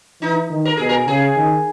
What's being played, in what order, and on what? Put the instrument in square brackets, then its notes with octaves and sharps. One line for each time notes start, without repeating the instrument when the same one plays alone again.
[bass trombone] E3 [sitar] D#4
[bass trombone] D#3
[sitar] A#4
[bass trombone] B2 [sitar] G#4
[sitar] A#4
[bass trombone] C#3 [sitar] G#4
[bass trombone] D#3